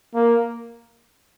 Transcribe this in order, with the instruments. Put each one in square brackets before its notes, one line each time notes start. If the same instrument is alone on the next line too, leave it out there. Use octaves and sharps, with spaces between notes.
[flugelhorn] A#3